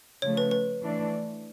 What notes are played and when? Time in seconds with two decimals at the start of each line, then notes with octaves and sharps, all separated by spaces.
0.22 C#3 F3 A3 C#5
0.37 B4
0.51 B4
0.82 E3 A3 D4